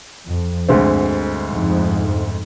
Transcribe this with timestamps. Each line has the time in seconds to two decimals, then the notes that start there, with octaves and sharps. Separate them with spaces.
0.28 F2
0.69 D2 G2 D3 G#3 C4
1.51 F2 G#2